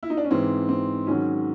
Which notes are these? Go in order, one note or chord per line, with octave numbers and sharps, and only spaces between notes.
E4
D#4
D4
C#4
G#2 E3 C4
C4
G#2 D#3 F#3 C#4